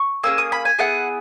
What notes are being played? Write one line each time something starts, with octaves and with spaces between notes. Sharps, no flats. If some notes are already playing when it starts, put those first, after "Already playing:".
Already playing: C#6
A#3 C#4 G#4 E6
D#6
B5
G#5
B3 E4 G#4 F#5